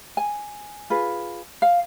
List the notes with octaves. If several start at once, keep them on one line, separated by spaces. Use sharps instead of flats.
G#5
F4 G#4 B4
F5